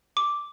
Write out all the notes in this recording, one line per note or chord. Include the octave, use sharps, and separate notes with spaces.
D6